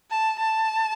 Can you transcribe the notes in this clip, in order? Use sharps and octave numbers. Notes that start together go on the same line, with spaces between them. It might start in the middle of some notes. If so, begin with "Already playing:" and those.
A5
A5